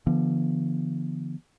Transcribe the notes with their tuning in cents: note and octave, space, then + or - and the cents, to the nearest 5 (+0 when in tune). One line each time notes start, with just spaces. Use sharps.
D3 +0 F3 -45 B3 -25